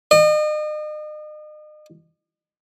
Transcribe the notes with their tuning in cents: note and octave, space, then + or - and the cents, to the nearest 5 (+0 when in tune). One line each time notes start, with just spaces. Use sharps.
D#5 -40